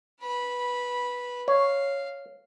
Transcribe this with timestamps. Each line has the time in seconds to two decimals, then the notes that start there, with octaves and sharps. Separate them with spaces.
0.21 B4 B5
1.48 C#5 F5